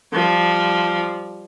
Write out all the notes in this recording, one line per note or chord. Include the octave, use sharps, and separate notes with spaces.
F3 G3